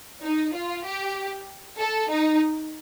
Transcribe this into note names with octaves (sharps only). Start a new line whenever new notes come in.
D#4
F4
G4
A4
D#4